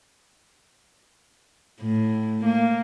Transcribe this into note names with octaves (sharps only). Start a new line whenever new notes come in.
A2
A#3